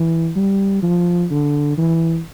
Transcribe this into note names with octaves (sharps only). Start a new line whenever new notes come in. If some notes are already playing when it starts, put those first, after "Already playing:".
Already playing: E3
G3
F3
D3
E3